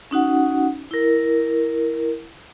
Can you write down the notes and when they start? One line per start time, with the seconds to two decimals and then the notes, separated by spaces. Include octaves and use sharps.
0.11 C#4 D#4 F#4 F#5
0.91 E4 A#4